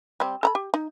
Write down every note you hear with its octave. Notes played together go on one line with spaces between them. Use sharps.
G3 C4
A4 A#5 B5
G4
D#4